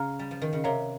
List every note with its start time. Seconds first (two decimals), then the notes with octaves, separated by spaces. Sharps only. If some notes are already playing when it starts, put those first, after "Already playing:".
Already playing: C#3 F5 A#5 F6
0.19 G3
0.31 F3
0.42 D#3
0.53 C#3
0.64 C3 A#4 C#5 F5 A#5